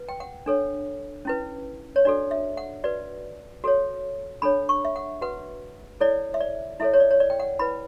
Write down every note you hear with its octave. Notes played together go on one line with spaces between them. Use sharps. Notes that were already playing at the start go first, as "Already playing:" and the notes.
Already playing: B4
G5
F#5
D4 A4 C#5
C#4 E4 B4
C#5
D4 F#4 A4 D5
E5
F#5
F#4 B4 D5
F#4 A4 C#5
D4 A4 C#5 B5
C#6
E5
F#5
F#4 B4 F#5
E4 A4 C#5 D5
E5
D5
E4 A4 C#5 E5
C#5
D5
C#5
D5
G5
F#5
E4 B4 B5